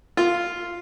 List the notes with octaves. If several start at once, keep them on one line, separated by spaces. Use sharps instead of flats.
F4